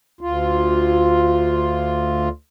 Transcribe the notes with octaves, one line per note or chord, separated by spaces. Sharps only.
D2 F4